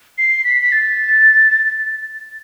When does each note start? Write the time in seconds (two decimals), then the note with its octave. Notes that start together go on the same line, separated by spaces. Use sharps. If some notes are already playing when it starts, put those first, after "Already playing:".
0.18 C7
0.44 B6
0.62 B6
0.72 A6